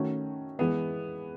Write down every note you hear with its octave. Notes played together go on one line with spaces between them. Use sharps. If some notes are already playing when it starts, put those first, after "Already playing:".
Already playing: D#3 A3 C#4 F#4
E3 G#3 B3